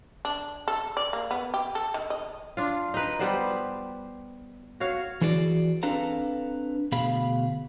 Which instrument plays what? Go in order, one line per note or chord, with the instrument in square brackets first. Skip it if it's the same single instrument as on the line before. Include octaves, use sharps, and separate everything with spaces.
[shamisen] D4
A4
D5
A#3
B3
G4
A4
D#3
D#5
[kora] D4 F4
D#4 B4
G3 B3 C5 D5
F#4 C#5 F5
[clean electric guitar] E3 F#4 G#4 D5
C4 D4 A4 B4 F5 A#5
D2 B2 G#4 F5 B5